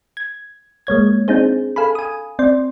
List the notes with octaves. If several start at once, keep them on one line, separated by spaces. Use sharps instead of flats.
G#6
G#3 A#3 C#5 G#6
C4 D4 D#4 G#4 C5
A4 F5 G#5 B5
G#5 D#6
C4 D5 C6